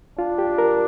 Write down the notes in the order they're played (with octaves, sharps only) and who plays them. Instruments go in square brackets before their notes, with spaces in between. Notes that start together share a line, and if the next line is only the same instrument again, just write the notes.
[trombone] D4 [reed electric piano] F4
[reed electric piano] G4
A#4